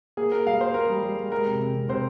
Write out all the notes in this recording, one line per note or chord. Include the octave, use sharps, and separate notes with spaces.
A#3 G#4
A#3 A#4
G3 F5
A#3 C5
A#3 A#4
G3
G3
G3
G#3 A#4
C3
C3
C3
C3 C5